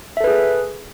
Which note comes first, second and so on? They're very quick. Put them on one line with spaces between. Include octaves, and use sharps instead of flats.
E5 A4 B4 G#4